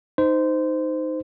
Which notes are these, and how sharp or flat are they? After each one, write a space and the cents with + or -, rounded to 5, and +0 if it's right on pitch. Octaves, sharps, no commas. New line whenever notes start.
D#4 +0 C5 -20